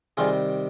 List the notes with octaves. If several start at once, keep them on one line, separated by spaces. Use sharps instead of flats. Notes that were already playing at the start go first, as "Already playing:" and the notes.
C3 D#3 G3 F4 G#4